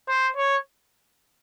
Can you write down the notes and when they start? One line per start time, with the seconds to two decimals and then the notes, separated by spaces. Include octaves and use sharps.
0.08 C5
0.36 C#5